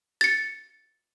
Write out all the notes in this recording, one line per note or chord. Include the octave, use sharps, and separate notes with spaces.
A6 C#7